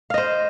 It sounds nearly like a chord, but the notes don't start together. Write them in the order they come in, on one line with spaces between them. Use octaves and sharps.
F5 D#5 C5